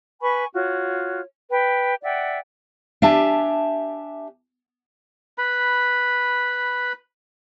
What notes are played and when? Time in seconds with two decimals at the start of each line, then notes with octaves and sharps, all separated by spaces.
0.21 B4 G#5 B5 C#6
0.54 F4 F#4 C#5
1.50 B4 G5
2.03 D5 E5 F#5 G5
3.02 D4 G4 E5 G#5 A5
5.38 B4 B5